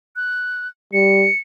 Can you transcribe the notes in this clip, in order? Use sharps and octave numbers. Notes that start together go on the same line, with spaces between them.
F#6
G3 C#7